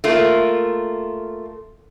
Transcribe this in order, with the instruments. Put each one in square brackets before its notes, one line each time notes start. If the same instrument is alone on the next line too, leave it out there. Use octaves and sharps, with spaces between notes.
[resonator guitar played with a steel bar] A3 A#3 F4